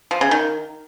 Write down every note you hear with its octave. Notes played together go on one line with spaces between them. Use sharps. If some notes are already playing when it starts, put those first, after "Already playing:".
F3
C#3
D#3